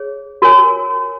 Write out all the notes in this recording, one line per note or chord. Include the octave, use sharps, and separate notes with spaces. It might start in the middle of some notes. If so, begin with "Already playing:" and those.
Already playing: G#4 C#5
F#4 A#4 C#5 G#5